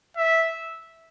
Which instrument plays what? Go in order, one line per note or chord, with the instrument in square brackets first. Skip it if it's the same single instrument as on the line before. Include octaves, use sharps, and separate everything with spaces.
[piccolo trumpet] E5